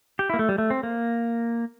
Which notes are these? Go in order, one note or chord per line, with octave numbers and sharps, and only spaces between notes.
G4
E4
A#3
A3
G3
A3
C4
A#3